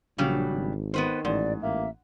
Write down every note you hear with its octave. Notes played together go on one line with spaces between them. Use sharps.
A#1 C#3 F#3 G3 D4
G#1
D#3 B3 B4 C5
A1 G#2 D5
A1 A#3 E5